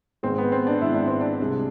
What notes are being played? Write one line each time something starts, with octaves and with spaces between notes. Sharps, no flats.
G#1 G#2 G#3 C4
B3
C4
D4
G#1 G#2 G#3 E4
D4
C4
D4
C2 C3 G#3